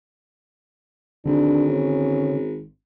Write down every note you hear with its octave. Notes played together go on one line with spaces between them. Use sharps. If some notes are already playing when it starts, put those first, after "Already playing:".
G#1 D3 D4
C#4